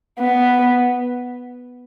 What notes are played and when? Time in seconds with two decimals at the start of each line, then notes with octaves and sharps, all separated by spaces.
0.20 B3